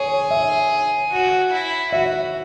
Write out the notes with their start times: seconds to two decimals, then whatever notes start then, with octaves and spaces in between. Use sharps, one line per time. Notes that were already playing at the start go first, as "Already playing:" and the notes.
Already playing: G#4 C#5
0.31 E5
1.11 F#4
1.52 E4
1.92 F#4 E5